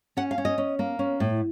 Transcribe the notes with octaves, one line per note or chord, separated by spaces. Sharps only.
C#4 F#5
F5
C#4
D#5
C#4
A#3
C#4
A2